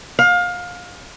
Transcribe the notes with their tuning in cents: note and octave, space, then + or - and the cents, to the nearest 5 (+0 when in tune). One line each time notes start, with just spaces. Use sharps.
F5 +25